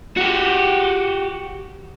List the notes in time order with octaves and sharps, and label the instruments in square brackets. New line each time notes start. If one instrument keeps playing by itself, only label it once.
[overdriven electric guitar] F#4 G4